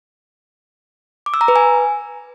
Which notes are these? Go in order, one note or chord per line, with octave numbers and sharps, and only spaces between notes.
D6
E6
A#5
B4
G#5